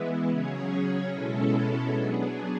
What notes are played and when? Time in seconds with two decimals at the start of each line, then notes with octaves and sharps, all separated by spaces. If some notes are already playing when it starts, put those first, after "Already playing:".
Already playing: E3 G#3 B3 E4
0.29 C#3 F#3 C#4 G#4 C#5
1.11 B2 G#3 C#4 E4 A4
1.92 F#3 B3 D4 G#4